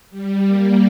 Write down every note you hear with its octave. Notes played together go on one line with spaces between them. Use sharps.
G3
A#3